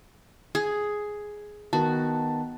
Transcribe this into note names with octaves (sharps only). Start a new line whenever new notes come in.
G#4
D#3 B3 F#4 A5